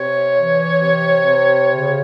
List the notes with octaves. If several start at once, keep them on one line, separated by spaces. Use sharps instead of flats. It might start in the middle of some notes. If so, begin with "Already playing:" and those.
Already playing: C3 C#5
E3
C3
C3
C#3